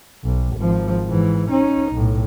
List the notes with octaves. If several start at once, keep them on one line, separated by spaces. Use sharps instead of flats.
B1
G#1 F3
G#2 E3
C#4 D#4
B1 A2